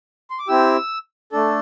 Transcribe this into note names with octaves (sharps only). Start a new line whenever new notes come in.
C6
D6
C4 E4 G4 E6
A3 D4 A4